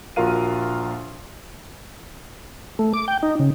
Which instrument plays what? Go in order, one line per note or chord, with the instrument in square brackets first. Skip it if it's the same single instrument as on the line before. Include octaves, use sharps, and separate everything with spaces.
[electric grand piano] A#1 F4 F#4 A#4 F5 D#7
[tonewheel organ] A3
D6
G5
D#4
C#3